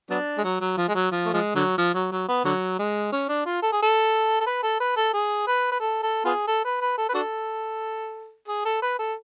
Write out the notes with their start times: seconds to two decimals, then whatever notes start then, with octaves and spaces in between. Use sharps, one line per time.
0.10 F#3 B3 D4
0.38 G#3
0.44 F#3
0.61 F#3
0.77 F3
0.88 G#3
0.95 F#3
1.12 F3
1.26 A3
1.33 F3 G#3
1.55 D3 F#3
1.78 F3
1.95 F#3
2.12 F#3
2.28 B3
2.45 D3 F#3
2.79 G#3
3.12 C#4
3.29 D4
3.46 F4
3.62 A4
3.72 G#4
3.82 A4
4.41 A4
4.46 B4
4.63 A4
4.80 B4
4.97 A4
5.14 G#4
5.47 B4
5.72 B4
5.80 A4
6.03 A4
6.25 B3 F4 G#4
6.47 A4
6.65 B4
6.81 B4
6.98 A4
7.09 B4
7.14 D4 F#4 A4
8.48 G#4
8.65 A4
8.82 B4
8.99 A4